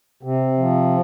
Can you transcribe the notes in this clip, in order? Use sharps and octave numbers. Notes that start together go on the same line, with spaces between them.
C3
F3